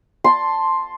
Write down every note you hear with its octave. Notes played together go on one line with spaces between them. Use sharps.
A5 C6